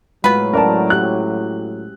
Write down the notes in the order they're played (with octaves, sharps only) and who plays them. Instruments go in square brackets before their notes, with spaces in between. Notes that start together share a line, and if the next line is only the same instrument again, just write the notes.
[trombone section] A2 F#3 [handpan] G#3 F4 F5 [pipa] B3 B4
[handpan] C#4 C5 [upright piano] A#4 D5 A5
[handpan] F#4 G4 [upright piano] F#6